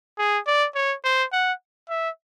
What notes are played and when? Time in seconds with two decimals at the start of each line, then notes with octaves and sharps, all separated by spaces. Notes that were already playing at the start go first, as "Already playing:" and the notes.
0.18 G#4
0.47 D5
0.75 C#5
1.04 C5
1.32 F#5
1.89 E5